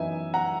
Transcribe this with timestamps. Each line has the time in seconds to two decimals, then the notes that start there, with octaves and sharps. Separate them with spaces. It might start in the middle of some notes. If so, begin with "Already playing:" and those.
Already playing: F#2 E3 B3 D#4 E5 G#5
0.34 F#5 A#5